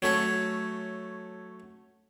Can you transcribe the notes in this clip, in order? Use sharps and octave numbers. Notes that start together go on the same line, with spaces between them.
F#3 A3 C#4